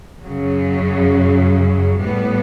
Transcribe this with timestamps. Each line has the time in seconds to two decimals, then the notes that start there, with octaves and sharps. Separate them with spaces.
0.22 F#2 C#3 F#3
1.99 A2 G3 B3